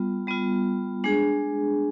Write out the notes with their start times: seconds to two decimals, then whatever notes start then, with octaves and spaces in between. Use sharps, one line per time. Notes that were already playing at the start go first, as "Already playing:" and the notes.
Already playing: G3 B3 F4
0.27 G3 B3 F4
1.04 G#3 D4 G#4